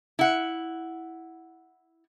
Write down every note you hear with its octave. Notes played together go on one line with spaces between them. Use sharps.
E4 F#5